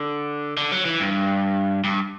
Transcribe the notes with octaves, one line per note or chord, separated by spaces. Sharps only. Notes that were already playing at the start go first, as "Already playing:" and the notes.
Already playing: D3
D3
F#3
E3
G2
G2